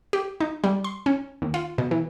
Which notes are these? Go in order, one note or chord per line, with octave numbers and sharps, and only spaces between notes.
G4
D#4
G3
C6
C#4
D#2
F4
B2
E3